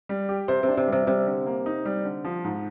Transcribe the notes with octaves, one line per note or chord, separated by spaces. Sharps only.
G3
G4
C3 C5
C3
D4
C3
C3 G3
C3 G3
D3
A#3
D#4
G3
D3
F3
G#2